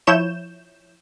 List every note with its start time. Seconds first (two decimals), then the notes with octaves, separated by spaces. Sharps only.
0.07 F3 E4 C#5 G6 E7